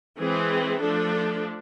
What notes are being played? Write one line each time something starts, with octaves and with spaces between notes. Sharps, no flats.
E3 G#3 C4 G#4
F3 A3 D4 A4